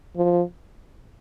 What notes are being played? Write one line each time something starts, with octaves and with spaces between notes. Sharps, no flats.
F3